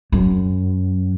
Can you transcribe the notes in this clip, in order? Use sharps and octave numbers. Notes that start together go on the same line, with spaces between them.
F#2